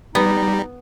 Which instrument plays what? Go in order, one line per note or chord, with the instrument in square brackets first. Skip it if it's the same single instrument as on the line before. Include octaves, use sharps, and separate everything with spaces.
[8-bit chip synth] G3 [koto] B3 [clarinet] D#4